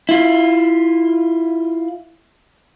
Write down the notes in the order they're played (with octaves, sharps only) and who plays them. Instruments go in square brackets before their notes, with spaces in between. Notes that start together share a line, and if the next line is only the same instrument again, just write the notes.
[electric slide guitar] E4 F4